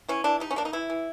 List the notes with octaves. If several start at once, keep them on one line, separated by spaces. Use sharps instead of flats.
E3 C#4
E3 D4
G3 D#4
C#4
A#3 D4
D#4
E3 E4
E3